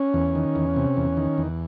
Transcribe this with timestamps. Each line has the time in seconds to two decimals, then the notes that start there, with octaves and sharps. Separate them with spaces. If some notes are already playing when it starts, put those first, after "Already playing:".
Already playing: C#4
0.14 E2
0.35 D#3
0.56 E2
0.76 C3
0.97 E2
1.17 D#3
1.38 E2